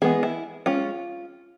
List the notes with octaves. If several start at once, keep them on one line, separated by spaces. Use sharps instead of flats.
E3 G#3 B3 G#4
E4
G#3 C#4 F4